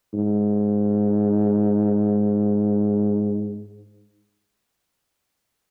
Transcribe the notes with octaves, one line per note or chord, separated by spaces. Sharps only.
G#2